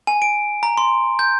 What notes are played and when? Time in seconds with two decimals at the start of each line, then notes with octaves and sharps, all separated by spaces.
0.07 G#5
0.22 D7
0.63 A#5
0.78 C6
1.19 G6